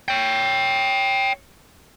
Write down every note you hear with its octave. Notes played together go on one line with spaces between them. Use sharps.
C#5 G5